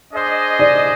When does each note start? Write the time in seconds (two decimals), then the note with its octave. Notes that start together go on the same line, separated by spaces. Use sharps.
0.13 D4 G#4 C5 D#5
0.59 D5